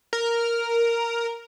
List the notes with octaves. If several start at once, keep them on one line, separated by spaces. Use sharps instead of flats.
A#4